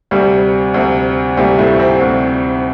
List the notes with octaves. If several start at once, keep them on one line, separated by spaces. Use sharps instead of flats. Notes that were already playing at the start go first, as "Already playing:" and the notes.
D2 C3 G3
D2 C3
D2 C3 G3
A2 A3
C3 C4
D2 C3